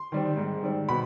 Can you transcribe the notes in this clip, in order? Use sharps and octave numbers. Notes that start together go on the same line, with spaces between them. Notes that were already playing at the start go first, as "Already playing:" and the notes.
Already playing: C6
D#3 G3 C4
G#2
D#3 G3 C4
B2 B5